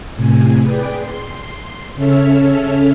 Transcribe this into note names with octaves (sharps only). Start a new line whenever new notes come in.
A2 C3 G#5
G#4 B4 D5 G5
C6
C#3 C#4 A4 C#5 E5 F6